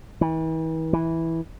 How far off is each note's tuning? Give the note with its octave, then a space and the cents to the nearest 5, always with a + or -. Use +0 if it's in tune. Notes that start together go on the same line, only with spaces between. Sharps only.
E3 -40
E3 -10